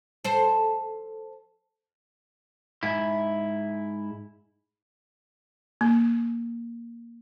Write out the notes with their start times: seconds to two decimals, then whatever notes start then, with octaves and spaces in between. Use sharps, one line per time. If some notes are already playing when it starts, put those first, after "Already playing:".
0.24 A4 C5
2.83 G#2 E4
5.81 A#3